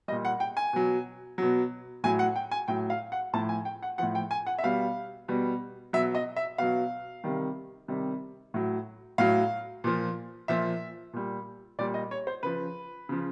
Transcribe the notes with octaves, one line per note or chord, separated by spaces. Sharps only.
A#2 G3 D#5
F#5
G5
G#5
B2 F#3
B2 F#3
A2 F#3 G#5
F#5
G5
G#5
A2 F#3 G5
F5
F#5
A2 F3 A5
G#5
G5
F#5
A2 F3 F#5
G5
G#5
F#5
E5
B2 G3 F5
B2 G3
B2 F#3 E5
D#5
E5
B2 F#3 F5
C3 D#3 G3
C3 D#3 G3
A2 F#3
A2 F#3 F5
A#2 F3
A#2 F3 E5
A#2 G3
A#2 G3 D5
D#5
C#5
C5
C#3 F3 B4
C#3 F3